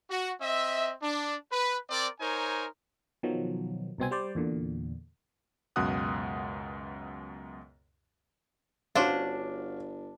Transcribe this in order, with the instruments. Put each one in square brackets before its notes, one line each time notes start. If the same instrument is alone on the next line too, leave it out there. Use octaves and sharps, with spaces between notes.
[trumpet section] F#4
C4 D#5 E5
D4
B4
C4 A#4 D5
D#4 A#4 C5 C#5 G#5
[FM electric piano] B2 D#3 F3 F#3
C2 B2 C4 G#5
G3 C5 D5
E2 A#2 D3
[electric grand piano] C#2 F#2 B2 F#5 D#6 F#6
[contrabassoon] G1 [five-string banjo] C#4 C5 F#5 [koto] D4 [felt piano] F#4 F5